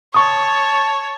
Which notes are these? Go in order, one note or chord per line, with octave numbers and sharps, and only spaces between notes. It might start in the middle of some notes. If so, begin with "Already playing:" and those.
C#5 A5 C#6 D#6